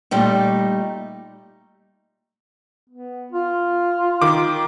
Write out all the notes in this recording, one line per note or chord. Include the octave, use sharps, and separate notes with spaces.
A#2 G3 A3 D#4
B3
F4
D#3 D6